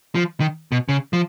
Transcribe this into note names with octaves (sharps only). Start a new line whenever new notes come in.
F3
D#3
B2
C#3
F3